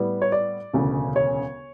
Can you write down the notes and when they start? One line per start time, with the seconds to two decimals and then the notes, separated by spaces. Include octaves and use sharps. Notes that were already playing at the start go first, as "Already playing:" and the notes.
Already playing: A2 G3 B3
0.22 C#5
0.32 D5
0.73 E1 D2 C#3
1.16 C#5